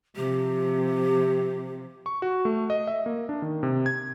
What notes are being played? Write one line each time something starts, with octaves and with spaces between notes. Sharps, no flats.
C3 F3 G4
C#6
F#4
A3
D#5
E5
A#3
D4
D#3
C3
G#6